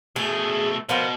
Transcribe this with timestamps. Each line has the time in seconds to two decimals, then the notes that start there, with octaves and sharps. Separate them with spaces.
0.16 B2 A3 G#4
0.89 B2 F3 A#3 B3